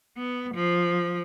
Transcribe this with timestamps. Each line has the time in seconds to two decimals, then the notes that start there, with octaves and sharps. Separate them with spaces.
0.17 B3
0.54 F3